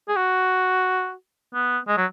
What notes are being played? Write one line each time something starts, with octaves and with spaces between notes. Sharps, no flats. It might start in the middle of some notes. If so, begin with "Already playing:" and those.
G#4
F#4
B3
G#3
F#3